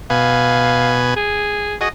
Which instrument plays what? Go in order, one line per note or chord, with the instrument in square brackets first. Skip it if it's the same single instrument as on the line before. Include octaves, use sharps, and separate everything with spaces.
[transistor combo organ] B2 B4 G#5 [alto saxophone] F5
[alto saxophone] G#4
[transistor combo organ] F#4 G#4 [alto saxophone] D#5